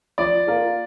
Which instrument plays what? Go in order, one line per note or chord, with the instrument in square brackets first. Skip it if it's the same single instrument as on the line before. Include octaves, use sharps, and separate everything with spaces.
[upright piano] F3 [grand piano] D5
[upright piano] A#3 F4 A#4